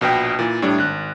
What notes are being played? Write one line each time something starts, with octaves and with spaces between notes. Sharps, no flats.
A#1 B2 B4 G5
A#2 E3
A2 G3 D4
G#1 F#6